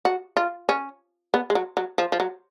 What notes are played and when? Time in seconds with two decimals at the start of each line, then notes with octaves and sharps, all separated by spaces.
0.05 F#4
0.37 F4
0.69 C#4
1.34 B3
1.50 G#3
1.55 F#3
1.77 F#3
1.98 F3
2.12 F3
2.20 F#3